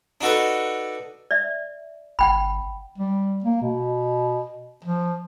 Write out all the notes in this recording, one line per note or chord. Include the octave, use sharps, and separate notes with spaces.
D4 D#4 F#4 A4 B4
D5 E5
G1 F#5 G5 B5
G3
A#3
B2
F3